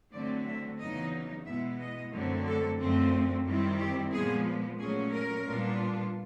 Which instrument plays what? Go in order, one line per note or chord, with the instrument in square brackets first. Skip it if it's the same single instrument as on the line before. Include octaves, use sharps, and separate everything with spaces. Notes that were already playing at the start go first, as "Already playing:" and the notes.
[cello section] D3 F#3 A3 C4 D5
E5
E2 C#3 F#3 B3 D#4 D#5
B2 G#3 B3 E4 E5
D#5
F#2 D3 F#3 A3 C4
A4
F#2 D3 F3 A3 C4
F#2 D#3 G3 C4 E4
G4
A#2 F3 G#3 B3 G#4
A#2 F#3 A3 C#4 G#4
A#4
A#2 G3 B3 D4 F4